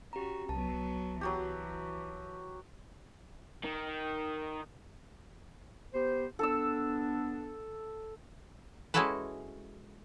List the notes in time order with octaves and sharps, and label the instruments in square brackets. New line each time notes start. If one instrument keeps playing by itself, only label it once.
[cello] C#4 F#4 [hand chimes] G4 A#5
[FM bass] C2 [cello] F#3 B3 [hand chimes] A5
[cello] E3 [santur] F#3 F#4 G4
[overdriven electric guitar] D#3
[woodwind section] B3 G4 C5
[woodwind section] B3 D4 [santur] A4 A5 E6
[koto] G#3 C#4 E4 F#4 A4 B4